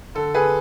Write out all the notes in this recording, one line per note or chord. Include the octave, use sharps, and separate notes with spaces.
D3 A4
D3 G#4 B4